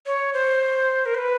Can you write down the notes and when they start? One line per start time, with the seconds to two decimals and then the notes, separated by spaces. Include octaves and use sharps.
0.06 C#5
0.34 C5
1.06 A#4
1.15 C5
1.18 B4